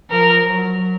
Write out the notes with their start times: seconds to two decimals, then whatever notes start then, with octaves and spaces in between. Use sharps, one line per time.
0.10 F3 A#4
0.46 F#3